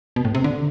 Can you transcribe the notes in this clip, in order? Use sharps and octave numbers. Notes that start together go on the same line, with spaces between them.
B2
A2
C3
D3